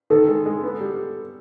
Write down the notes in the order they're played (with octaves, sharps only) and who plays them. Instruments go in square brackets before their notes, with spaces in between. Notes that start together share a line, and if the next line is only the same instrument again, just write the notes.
[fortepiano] D#3 [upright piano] A4
[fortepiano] G#3
G#3
B3
G3